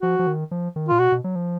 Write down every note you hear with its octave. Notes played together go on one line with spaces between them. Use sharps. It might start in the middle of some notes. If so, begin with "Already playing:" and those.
F3 F#4
F3
D#3
F3
D#3
A#2 F4
B2 F#4
B2
F#3
F3